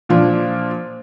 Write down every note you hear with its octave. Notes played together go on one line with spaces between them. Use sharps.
A#2 F3 D4 F4